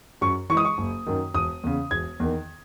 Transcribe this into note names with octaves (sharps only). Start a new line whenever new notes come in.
F#2 C#6
E3 G#3 C#6 D#6
C#6
F#1
F#2 D#3
E1 D#6
E2 C#3
E1 G#6
E2 D#3